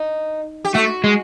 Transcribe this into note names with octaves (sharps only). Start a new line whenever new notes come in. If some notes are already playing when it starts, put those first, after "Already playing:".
Already playing: D#4
G4
A3 F#4
G#3